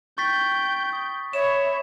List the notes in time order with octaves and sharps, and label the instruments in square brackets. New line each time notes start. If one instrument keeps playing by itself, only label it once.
[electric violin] G5 G6 [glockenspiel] C#6 A6 B6
[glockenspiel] D#6
[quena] C#5 [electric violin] E5 B5 [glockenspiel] E7